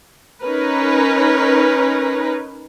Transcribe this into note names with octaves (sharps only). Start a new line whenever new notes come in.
C#4 D#4 A#4 B4